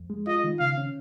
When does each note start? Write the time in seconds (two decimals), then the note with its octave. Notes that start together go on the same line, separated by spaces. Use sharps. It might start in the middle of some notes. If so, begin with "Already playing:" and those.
Already playing: F2
0.10 G#3
0.27 F4 D#5
0.44 D#3
0.60 C#3 F5
0.78 C#4